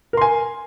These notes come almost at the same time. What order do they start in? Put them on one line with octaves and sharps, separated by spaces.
A#4 C6 G#5